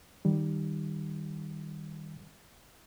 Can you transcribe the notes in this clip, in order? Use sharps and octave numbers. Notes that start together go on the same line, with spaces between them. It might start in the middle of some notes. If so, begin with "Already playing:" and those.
D#3 G3